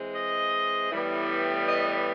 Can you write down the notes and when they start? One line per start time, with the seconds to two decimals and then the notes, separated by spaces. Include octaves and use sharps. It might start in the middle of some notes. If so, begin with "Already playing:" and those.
Already playing: E3 G#3 C4
0.15 D#5
0.90 A2 E3 G3 B3
1.66 D#5